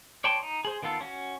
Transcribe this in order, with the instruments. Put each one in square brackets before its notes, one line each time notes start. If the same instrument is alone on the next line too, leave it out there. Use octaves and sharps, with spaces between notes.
[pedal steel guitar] C#5 D5 G5 A5 C6
D#4
G#4 C5
D#3 B3 F4 A4
C#4 F#4